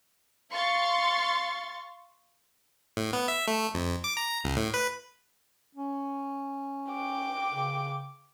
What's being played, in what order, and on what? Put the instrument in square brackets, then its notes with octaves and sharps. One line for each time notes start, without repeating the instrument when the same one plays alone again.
[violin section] F5 C6 C#6 A6
[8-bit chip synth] A2
B3
E5
A3
F2
D6
A#5
C#2
A2
B4
[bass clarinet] C#4
[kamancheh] G5 D6
[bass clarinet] C#3